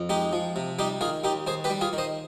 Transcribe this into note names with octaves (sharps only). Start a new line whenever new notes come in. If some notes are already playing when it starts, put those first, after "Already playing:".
Already playing: F2
G#3 D#4 G4
F3
C3
G3 D#4 G4
D#3 F4 G#4
D#2 D#4 G4
D#2 G#4 C5
G4 B4
G3
F4 G#4
D#3
C5 D#5